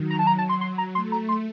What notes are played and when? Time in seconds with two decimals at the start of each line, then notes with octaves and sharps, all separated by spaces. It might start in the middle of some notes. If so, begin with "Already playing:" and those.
Already playing: D#3 F#3
0.10 A#5
0.19 A5
0.27 F#3 A#5
0.38 A5
0.49 C6
0.61 C6
0.78 A#5
0.95 A3 C6
1.12 A#5
1.29 C6